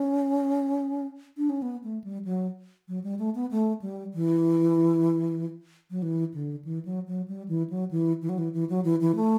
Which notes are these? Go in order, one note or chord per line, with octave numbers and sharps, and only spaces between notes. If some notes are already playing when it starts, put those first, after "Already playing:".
Already playing: C#4
D4
C#4
B3
A3
G3
F#3
F#3
G3
A3
B3
A3
G3
E3
F#3
E3
D3
E3
F#3
F#3
G3
E3
F#3
E3
E3
F#3
E3
E3
F#3
E3
E3
A3